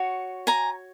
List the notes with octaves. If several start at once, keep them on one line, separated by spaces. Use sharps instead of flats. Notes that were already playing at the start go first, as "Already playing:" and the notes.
Already playing: F#4 C#5
G#5 A#5